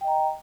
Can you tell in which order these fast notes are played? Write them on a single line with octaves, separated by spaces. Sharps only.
G5 D#5 A#5